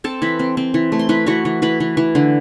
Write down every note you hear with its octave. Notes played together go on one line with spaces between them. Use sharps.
C4 A4 A5
E3 B4 B5
C4
C4
E3
A3
C6
E3 B4 B5
E3 F#4 F#5
E3
E3 B4 B5
E3
E3
D3